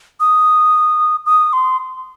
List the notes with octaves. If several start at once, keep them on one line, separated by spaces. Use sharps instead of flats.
D#6
D#6
C6